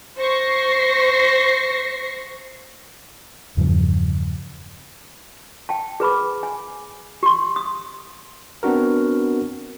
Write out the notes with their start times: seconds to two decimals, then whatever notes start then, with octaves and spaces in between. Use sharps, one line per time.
0.18 C5 C#6 A#6 C7
3.57 E2 G2 C#3 F3
5.69 G5 A5
6.00 G#4 B4 B5 D6
6.43 G#5
7.23 G4 C6
7.56 D#6
8.63 B3 C4 D4 F#4 A#4